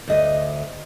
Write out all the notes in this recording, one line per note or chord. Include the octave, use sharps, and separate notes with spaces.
D2 D#5